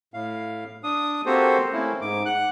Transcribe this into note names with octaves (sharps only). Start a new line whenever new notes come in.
A2 F5
D4 D#6
A#3 C4 F#4 G4 A4 C5
A3 A#3 C4 C#4 E4
G#2 D6
F#5 F#6